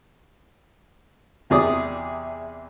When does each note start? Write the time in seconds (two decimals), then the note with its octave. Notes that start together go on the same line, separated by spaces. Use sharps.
1.50 E2 C3 G#4 D5 D#6